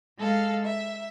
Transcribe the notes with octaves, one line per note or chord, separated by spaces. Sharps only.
G#3 A4 F5
E5